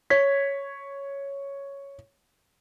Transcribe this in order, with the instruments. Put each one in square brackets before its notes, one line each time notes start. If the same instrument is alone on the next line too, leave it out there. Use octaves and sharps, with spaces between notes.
[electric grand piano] C#5 G#6 B6